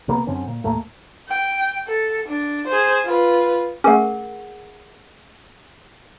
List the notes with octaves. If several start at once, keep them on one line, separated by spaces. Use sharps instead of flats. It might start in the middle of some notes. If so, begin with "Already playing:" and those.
D2 C3 A#3 B3
F#2 D3 C4 C#4
A#2
D#2 A2 A3 A#3
G5
A4
D4
G#4 C5
F4 B4
A3 C#4 G#4 A#4 F#5